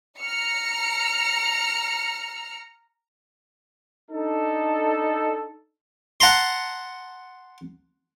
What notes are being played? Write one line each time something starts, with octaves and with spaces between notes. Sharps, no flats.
A#5 F6 C#7
D4 D#4 A4
F#5 A5 A#5 C6